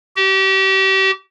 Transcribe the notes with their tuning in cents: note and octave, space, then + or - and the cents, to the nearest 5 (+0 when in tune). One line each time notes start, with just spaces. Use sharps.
G4 -35